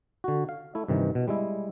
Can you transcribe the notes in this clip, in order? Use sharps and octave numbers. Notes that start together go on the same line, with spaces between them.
D3 F#4
F5
A3 E4
G2 C3 D#3 E3
B2
G3 G#3 E4